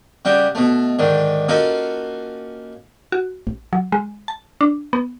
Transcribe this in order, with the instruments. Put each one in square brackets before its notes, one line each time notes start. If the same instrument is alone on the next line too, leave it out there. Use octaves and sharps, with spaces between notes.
[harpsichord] C#3 G3 F#4 G4
B2 A3
G#2 D3 D#3
A#3 C#4 D#4 F4 F#4 A4
[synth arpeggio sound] F#4
A1
F#3
G#3
A5
D4
B3